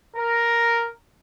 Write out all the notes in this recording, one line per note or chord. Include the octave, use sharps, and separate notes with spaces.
A#4